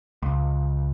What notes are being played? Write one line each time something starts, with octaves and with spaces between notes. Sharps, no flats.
C#2